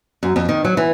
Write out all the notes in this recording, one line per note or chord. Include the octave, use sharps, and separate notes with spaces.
F#2
F2
D#3
F#3
E3